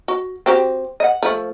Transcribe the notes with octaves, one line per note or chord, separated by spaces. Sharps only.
F#4
C4 F#4 G4
D#5 F#5
F3 A3